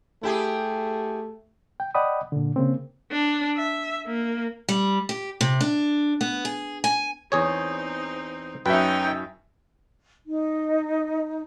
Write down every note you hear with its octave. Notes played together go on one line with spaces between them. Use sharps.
A3 E4 G4 G#4
G5
D5 D#5 F#5 G5 B5 D#6
A#2 D3
C#3 A#3 C4
D4
E5
A#3
G3
G4
C3
D4
B3
G#4
G#5
E2 C4 D#4 G#4 C#5
F#2 C#4 D#4 B4 E5 G5
D#4